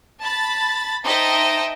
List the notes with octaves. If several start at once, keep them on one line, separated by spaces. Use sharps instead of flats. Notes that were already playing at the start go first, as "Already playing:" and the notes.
A5 B5 A6
D#4 C5 D#5 E5 G5 A5